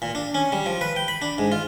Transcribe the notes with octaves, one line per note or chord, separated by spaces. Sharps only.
A#2
D4
C#4
G3
F3
B4
G5
B5
D4
G#2
F4